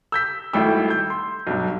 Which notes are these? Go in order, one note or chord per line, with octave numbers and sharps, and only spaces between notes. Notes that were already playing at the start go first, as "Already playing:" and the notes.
E6 G6 B6
G#1 G3 A3 E4 G5 E6
G6
C6
B1 G2